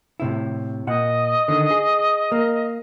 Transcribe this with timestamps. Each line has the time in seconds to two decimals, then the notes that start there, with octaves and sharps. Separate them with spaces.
0.20 A2 C3 E4
0.87 A#2 D#5 F#5
1.48 D3 D#3
1.71 G#4
2.32 A#3